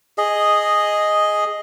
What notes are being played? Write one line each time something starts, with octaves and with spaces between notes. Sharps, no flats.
G#4 D#5